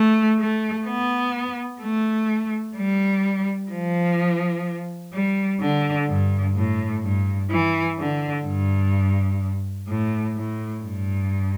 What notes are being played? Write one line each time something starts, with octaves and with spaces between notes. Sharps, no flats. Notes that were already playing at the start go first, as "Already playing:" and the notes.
Already playing: A3
A3
B3
A3
G3
F3
G3
D3
G2
A2
G2
E3
D3
G2
A2
A2
G2